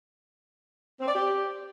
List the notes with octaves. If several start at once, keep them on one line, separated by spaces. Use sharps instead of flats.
C4
D5
G4